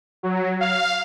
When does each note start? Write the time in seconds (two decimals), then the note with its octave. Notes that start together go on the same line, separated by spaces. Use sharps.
0.23 F#3
0.61 F5